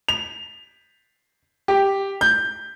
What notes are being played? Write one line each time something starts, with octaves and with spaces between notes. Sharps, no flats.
F7
G4
G6